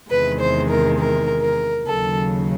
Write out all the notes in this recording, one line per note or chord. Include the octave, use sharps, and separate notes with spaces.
E2 C3 D#3 G#3 B4
C5
A#4
A#4
A#4
D#2 C#3 F#3 A4